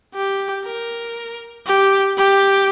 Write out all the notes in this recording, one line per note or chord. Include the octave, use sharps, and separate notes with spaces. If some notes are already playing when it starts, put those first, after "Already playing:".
G4
A#4
G4
G4